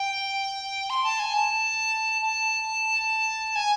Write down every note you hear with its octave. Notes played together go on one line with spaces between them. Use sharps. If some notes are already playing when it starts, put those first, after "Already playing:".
Already playing: G5
C6
A5
G#5
A5
A5
G#5